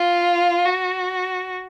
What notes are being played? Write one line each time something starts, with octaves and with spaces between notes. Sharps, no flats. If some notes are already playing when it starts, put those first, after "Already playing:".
Already playing: F4
F#4